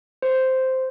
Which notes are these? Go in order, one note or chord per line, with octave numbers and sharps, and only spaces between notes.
C5